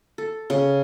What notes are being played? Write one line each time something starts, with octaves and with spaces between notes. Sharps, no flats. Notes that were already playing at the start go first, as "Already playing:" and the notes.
A4
C#3